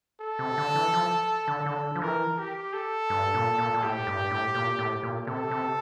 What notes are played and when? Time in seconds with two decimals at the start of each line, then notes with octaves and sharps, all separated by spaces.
0.21 A4
0.39 C3
0.58 D3
0.75 E3
0.94 F3
1.48 D3
1.65 D3 A4
1.95 F3
2.02 E3 A#4
2.39 G4
2.74 A4
3.10 G2
3.34 A#2
3.58 A#2
3.74 A#2
3.83 A2 G4
4.07 G2
4.31 A2
4.55 A#2
4.79 A2
5.03 A#2
5.27 C3 A4
5.51 C3